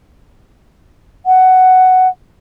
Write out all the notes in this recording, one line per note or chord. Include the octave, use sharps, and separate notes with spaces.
F#5